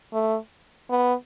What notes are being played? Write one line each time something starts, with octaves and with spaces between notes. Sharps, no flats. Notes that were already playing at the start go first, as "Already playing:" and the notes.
A3
B3